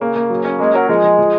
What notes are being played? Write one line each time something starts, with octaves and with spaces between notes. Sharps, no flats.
C#3 A#3
A#3
F#3
C#4
G#3 A#3
F#3 A#4
F3 G#3
F3
F3